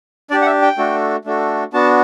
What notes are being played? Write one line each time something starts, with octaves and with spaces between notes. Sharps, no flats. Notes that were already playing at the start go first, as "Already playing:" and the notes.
D4 G4 D5
F#5
E5
G5
A3 D4 F#4 A4
A3 D4 F#4 A4
B3 D4 F#4 A5